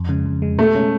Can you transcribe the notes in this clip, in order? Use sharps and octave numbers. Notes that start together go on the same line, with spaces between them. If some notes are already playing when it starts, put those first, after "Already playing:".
Already playing: F2
C#3 G#3
F2
C#3 G#3
B2 A3
G#3 C#4